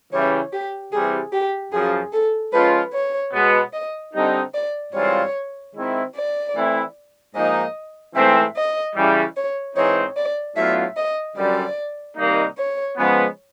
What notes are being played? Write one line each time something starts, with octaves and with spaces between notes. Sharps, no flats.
C#3 E3 G3 C#5
G4
C3 E3 G3 G#4
G4
F#2 C#3 F3 G#4
A4
F3 G#3 C#4 F4 B4
C#5
B2 G#3 B3
D#5
D3 G3 C4 D#4
D5
G#2 E3 G3 C4 F4 C#5
D#3 G#3 C4 E4
D5
E3 A3 C4 E4
G#2 F3 A#3 D#4 D#5
G#2 E3 A3 C4 E5
D#5
C#3 E3 G3
C#5
G#2 E3 G#3 C4 D#4 C#5
D5
A2 F#3 B3 D4 F4 E5
D#5
F#2 D3 G3 D5
C3 D#3 G3 A#3 D#4
C#5
C#3 F3 G#3 B3